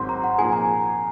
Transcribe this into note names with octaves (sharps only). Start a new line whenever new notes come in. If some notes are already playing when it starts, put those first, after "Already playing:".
Already playing: G#1 G#2 D#3 F#3 C4 C6
A#5
F#5
A#2 F3 A#3 D#4 G#4 G#5
A#5